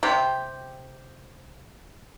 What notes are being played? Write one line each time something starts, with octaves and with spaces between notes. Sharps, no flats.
C3 G4